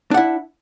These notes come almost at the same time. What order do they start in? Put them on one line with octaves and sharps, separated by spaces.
D4 F#5 E4